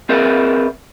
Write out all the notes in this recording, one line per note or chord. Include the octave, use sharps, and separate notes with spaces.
C4 G#4 A#4 B4 D5 E5